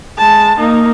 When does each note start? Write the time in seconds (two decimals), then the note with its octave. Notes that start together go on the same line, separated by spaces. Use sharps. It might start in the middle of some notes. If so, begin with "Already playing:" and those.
0.18 G#3 A5
0.59 A#3 D#4